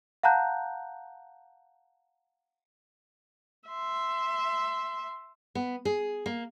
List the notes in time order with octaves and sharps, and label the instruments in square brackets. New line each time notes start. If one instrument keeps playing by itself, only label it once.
[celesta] F5 F#5 A5 A#5 F#6 G6
[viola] E5 C6
[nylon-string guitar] B3
G#4
A#3